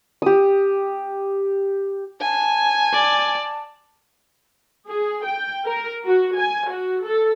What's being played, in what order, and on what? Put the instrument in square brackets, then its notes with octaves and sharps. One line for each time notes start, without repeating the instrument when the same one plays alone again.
[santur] G4 D#6
[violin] G#5 [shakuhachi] A5
[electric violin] D5
[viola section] G#4
G5
A#4
F#4
G#5
F#4
A4